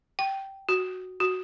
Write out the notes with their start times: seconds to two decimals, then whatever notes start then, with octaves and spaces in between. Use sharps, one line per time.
0.19 G5
0.69 F#4
1.20 F#4